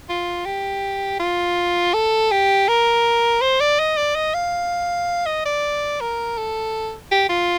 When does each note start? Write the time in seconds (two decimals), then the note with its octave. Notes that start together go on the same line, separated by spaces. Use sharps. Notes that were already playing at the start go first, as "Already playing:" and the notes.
0.10 F4
0.46 G4
1.20 F4
1.94 A4
2.31 G4
2.68 A#4
3.41 C5
3.61 D5
3.79 D#5
3.97 D5
4.16 D#5
4.34 F5
5.26 D#5
5.46 D5
6.01 A#4
6.38 A4
7.12 G4
7.29 F4